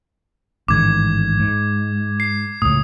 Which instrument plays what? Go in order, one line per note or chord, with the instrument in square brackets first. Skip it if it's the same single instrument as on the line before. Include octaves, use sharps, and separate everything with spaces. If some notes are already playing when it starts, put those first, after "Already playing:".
[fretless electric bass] A1 G#2 D#3 [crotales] D6 G#6
[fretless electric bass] G#2
[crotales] C7
[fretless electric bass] C#2 A2 [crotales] D#6